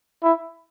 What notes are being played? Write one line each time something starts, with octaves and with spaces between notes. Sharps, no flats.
E4